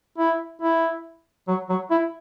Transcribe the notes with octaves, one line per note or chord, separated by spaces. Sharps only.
E4
E4
F#3
F#3
E4